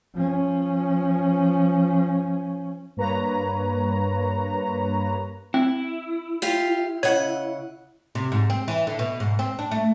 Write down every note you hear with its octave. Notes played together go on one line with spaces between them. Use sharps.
F3 C#4
G2 A#3 B4 C#5 A#5
C4 E4
F4 G4 F5
C#3 C#5 D#5 F#5
C3
G#2
C4
E3
D3
B2
G#2
C4
D4
A3